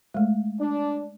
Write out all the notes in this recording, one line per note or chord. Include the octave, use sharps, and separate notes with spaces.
G#3 A3
D4